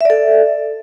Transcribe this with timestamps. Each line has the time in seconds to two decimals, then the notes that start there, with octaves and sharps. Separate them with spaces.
0.01 E5
0.05 D5
0.10 A4